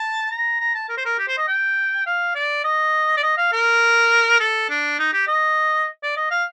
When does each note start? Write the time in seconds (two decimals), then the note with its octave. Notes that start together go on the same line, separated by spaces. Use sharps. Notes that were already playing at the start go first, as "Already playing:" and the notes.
Already playing: A5
0.31 A#5
0.60 A#5
0.75 A5
0.89 A#4
0.98 C5
1.05 A#4
1.18 G4
1.28 C5
1.38 D#5
1.48 G5
2.06 F5
2.35 D5
2.64 D#5
3.17 D5
3.23 D#5
3.37 F5
3.52 A#4
4.40 A4
4.70 D4
4.99 D#4
5.13 G4
5.28 D#5
6.03 D5
6.17 D#5
6.31 F5